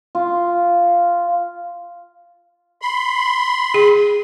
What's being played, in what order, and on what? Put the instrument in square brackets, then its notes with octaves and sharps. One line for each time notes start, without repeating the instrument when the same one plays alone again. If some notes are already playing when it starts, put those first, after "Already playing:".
[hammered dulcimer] F4
[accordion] B5 C6
[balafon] G#4